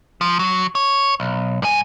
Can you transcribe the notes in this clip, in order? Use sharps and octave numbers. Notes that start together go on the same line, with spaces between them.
F3
F#3
C#5
B1
G2 G#5